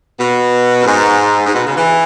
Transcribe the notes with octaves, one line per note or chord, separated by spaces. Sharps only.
B2
F#2
G#2
G#2
B2
C#3
E3